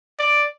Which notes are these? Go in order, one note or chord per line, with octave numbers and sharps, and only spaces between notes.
D5